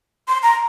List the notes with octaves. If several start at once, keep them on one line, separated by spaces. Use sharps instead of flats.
C6
A#5